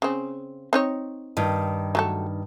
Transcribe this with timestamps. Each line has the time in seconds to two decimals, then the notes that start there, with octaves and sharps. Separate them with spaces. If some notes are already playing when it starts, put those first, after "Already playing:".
0.02 C#3 C4
0.73 C4 D#4 C#5
1.37 G2 D#3
1.95 F#3 A3 A4